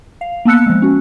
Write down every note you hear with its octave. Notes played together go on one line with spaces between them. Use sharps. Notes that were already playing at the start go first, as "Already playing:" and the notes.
F5
A#3 B3 A5 E6 F#6 C#7
F3 G#3
C#4 F#4